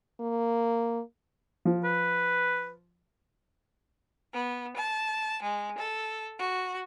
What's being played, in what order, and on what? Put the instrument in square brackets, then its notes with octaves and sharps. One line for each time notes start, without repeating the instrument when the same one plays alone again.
[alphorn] A#3
[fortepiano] F3
[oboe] B4
[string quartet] B3
A5
G#3
A4
F#4